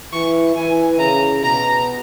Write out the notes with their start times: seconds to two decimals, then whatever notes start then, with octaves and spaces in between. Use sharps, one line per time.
0.13 E3 C#6
0.56 E3 G#5
0.99 C#3 A#5
1.43 B2 A#5